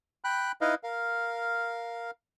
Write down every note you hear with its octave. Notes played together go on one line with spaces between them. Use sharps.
G5 B5 F#6
D#4 E4 B4 D#5 F5
A#4 F5